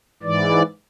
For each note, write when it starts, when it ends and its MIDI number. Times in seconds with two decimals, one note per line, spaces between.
0.23 0.62 44
0.23 0.62 52
0.23 0.62 74